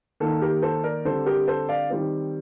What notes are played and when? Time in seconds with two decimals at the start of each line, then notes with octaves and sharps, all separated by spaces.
0.20 D#3 A#3 A4
0.42 G4 A#4
0.62 A4 C5
0.84 A#4 D5
1.05 D3 G3 C4 A4 C5
1.26 G4 A#4
1.48 A4 C5
1.69 D5 F5
1.90 D#3 G3 C4